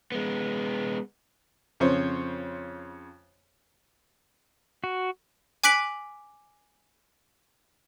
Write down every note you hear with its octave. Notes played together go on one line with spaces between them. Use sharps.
G#3 B3
F2 C#3 C5 C#5
F#4
G#5 D6 F#6 B6 D7 F#7